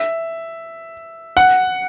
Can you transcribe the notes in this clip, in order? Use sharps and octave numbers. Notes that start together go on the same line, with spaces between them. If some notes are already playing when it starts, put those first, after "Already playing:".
Already playing: E5
F#5